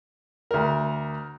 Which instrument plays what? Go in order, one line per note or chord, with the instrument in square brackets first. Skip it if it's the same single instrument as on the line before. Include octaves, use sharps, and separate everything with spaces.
[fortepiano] D2 A#4